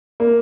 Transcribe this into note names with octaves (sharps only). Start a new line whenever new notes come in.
A#3